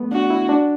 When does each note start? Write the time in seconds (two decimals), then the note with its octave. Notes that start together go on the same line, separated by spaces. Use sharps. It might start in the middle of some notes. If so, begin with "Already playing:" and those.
Already playing: A3 B3
0.11 D4 F#4
0.30 E4
0.49 D4